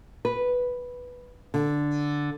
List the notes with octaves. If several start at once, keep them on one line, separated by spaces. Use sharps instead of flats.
B4
D3